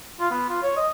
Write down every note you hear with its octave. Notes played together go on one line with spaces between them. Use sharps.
F4
B3
F4
C#5
D#5